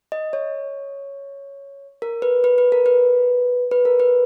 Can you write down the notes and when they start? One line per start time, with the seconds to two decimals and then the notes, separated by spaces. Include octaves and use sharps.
0.12 D#5
0.33 C#5
2.02 A#4
2.22 B4
2.44 B4
2.58 B4
2.72 A#4
2.86 B4
3.71 B4
3.85 A#4
4.00 B4